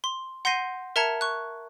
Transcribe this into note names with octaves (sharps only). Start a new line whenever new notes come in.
C6
F#5 C6 G6 A#6 C7 D#7
A#4 E5 A5 A#5 G#6 C#7
C#6 F#6